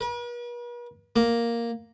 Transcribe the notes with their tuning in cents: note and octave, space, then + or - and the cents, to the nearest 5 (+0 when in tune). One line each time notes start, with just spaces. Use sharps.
B4 -45
A#3 +0